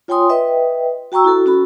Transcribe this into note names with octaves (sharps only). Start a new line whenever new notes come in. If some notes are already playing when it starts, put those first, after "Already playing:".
F4 C#5 G5 G#5 C6 D#6
B4 D#5 E5 G5
F#4 G5 A#5 C#6 E6
E4 F#4 A4
C#4 F#4 A4 B5